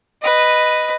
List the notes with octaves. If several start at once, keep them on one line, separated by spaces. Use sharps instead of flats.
B4 D#5